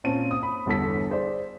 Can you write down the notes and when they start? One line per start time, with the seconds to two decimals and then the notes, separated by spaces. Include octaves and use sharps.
0.04 A#2 C4 C#4 A5 D#7
0.31 D#6
0.43 B5
0.66 G1 E2 D3 A4 B6
1.10 G#4 C5 D5